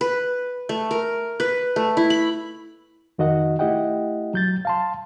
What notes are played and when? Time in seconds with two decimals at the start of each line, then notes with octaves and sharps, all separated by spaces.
0.01 B4
0.69 A3
0.91 A#4
1.40 B4
1.76 A3
1.97 E4
2.10 B5
3.18 F2 D#3 F#4 D#5 F#5
3.59 A3 E4 G4 D#5 F#5 G5
4.34 F#3 G6 A6
4.65 F5 A5 C6